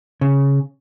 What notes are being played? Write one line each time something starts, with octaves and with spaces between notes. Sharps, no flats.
C#3